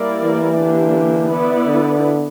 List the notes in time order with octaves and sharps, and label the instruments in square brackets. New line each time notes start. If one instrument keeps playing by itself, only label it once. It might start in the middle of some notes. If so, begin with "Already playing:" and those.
Already playing: [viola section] G3 A#3 E4 A#4 D5
[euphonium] E3
[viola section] D3 A#3 D4 G4
B3 E4 B4 D5
[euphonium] D3